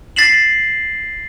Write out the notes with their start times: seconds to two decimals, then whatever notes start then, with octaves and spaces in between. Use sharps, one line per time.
0.16 A6 B6 C7 E7 F#7